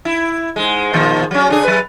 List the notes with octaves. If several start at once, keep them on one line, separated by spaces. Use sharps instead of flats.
E4
G#2 G#3
A#2 D#3 F3
F#3 C#4
C#3 D4 G#4
F#3 B4